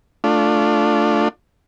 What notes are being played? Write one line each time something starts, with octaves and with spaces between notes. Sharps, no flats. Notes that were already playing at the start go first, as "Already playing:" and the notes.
A3 D4 F4